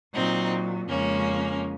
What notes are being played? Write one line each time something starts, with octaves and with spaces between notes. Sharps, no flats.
A#2 F#3 C4 D#4
F2 C#3 G#3 A#3 C#4